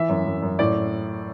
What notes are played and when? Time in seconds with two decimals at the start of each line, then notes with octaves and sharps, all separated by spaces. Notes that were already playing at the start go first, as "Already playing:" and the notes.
Already playing: E3 E5
0.09 F#2
0.26 F#2
0.42 F#2
0.59 A2 D5